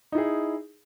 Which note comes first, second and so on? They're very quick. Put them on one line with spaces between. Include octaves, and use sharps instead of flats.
D#4 E4 G#4